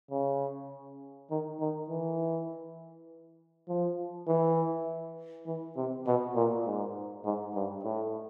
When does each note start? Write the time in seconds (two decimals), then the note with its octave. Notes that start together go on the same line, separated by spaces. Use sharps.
0.11 C#3
1.30 D#3
1.60 D#3
1.89 E3
3.68 F3
4.27 E3
5.46 E3
5.76 C3
6.07 B2
6.35 A#2
6.66 G#2
7.25 G#2
7.54 G2
7.84 A2